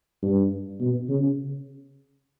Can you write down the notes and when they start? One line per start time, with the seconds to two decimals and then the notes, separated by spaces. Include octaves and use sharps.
0.22 G2
0.80 B2
1.09 C#3